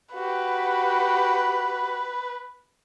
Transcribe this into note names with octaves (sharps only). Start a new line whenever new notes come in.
F#4 G4 B4